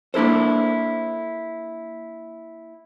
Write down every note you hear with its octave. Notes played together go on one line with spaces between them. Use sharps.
A#3 D4 E4 A4 C5